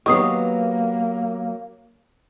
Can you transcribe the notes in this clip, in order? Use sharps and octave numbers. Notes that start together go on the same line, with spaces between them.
D#3 F#3 A#3 B3 G4 C#6 D#6 C7